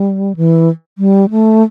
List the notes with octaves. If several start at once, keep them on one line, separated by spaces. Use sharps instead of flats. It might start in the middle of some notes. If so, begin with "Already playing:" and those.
Already playing: G3
E3
G3
A3